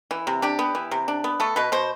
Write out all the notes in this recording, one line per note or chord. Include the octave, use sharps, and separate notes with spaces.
E3
C3
D4 G4
B3
E3
C3
D4
B3
A3 A4
B2 B4
B2 C5